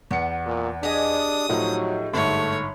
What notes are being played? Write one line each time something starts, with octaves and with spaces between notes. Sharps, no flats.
E2 B3 C#7
A#2
D4 G4 G#4 D#5 D#6
A2 F3 F#3 D#4
G1 G#2 A3 C#5